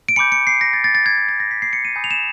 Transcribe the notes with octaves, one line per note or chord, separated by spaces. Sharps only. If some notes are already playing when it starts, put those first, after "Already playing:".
D7
G#5 B5 D6 G6 C#7
C#7
C7
A#6
A6
A6
A6
G#6
G#6
A6
A#6
B6
C7
C#7
D#7
G#5 B5 D#6 G6
F7
E7